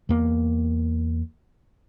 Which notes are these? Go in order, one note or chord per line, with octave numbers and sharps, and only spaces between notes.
E2 A#3